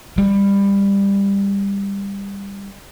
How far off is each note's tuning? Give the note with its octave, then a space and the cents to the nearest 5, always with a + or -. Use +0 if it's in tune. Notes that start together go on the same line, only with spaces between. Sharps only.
G3 +20